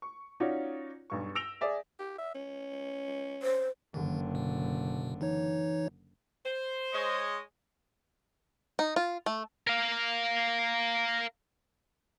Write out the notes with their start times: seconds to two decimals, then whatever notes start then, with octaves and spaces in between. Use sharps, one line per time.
0.02 C#6
0.40 C#4 D#4 F4 F#4 C#5 D5
1.10 B1 G2 C#6
1.35 E6 A#6 D7 F7 G7
1.61 G#4 D5 E5
1.99 G4
2.18 E5
2.35 C#4
3.43 C5
3.94 F#1 D3 D#3
4.35 B2
5.21 E3 D#4 C#5
6.46 C5
6.93 G#3 C#5 D#5
8.79 D#4
8.96 F4
9.26 A3
9.67 A#4 F5